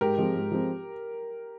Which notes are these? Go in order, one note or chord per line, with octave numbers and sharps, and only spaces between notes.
G#2 G4 A#4
F3 G#3 C4 F4
G#2
F3 G#3 C4 F4